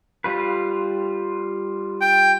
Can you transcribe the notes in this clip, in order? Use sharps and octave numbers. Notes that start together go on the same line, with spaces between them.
G3 F4 B4
G5